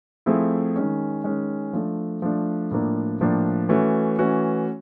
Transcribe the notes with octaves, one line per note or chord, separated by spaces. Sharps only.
F3 A3 C4 E4 G#4
D#3 G#3 C#4
D#3 G#3 C#4
F3 A3 D4
F3 A3 D4
A2 F3 A#3 D4
A2 F3 A#3 D4
E3 A3 C#4 F#4
E3 A3 C#4 F#4